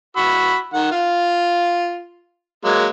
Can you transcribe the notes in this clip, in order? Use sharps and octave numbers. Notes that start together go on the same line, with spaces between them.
F#4 B5 E6
D#3 F#5
F4 F5
F#3 G#3 A#3